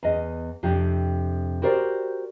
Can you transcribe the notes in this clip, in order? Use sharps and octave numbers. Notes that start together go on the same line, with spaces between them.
E2 D#5
F2 C3 D4 G4
F#4 G4 A#4 C5 D5